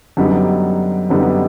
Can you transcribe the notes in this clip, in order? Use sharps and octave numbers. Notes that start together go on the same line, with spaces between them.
F#2 D3 G3 B3 D#4
F#2 D3 G3 B3 D#4